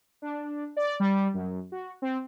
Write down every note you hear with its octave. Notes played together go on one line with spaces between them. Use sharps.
D4
D5
G3
F#2
F#4
C4